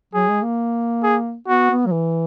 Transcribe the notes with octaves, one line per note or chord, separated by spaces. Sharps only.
F#3 G#4
G#3
A#3
G#4
B3 F#4
B3
F#3
E3